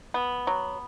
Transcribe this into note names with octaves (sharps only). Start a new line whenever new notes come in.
B3
F#3